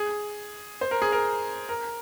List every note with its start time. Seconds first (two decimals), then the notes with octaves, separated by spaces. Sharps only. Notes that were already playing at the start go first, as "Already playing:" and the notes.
Already playing: G#4
0.81 C5
0.91 A#4
1.02 G#4
1.12 A#4
1.69 A#4